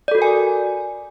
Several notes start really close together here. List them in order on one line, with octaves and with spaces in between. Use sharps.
D5 A4 F#4 A#4 G#5